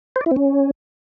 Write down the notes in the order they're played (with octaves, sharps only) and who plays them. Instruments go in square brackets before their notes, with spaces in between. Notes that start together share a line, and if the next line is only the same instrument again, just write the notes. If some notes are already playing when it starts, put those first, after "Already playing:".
[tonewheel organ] C5
D5
E4
C4
C#4